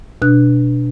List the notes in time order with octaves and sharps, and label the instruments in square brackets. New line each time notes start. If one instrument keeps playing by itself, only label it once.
[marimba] B2 D4 F#6